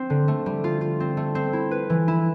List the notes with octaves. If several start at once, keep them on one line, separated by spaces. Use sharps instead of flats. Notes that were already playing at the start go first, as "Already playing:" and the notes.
Already playing: C4
D3
A3
G3
F4
F4
C4
A3
C4
E4
B4
E3
E4